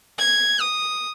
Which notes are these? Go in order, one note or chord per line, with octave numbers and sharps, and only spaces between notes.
G#6
D#6